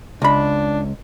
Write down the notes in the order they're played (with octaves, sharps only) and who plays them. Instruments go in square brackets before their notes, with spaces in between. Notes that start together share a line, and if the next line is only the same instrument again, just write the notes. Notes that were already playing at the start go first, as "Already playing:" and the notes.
[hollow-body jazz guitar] C#2 B5 [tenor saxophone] D4